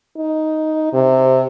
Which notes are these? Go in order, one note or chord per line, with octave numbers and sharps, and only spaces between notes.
D#4
C3